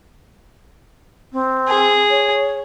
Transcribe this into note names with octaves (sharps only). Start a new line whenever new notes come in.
C4
G#4
C#5